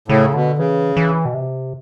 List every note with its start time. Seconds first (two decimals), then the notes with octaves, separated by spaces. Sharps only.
0.08 A2 C#3
0.34 B2 D3
0.58 C#3 E3
0.97 E3
1.25 B2
1.34 C3